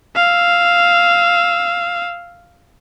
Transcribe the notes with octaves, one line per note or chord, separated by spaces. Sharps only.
F5 E6